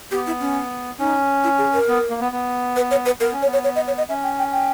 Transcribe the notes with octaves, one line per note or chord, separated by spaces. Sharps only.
B3 G4
E4
C#4
C#4 D#4
E4
G#4
A#4
B3
A#3
B3
B3
B4
C#5
B4
B3 A#4
C#4
C#5
B3
C#5
C#5
D#5
C#5
D#5
C#4 E5
G5
G5
G5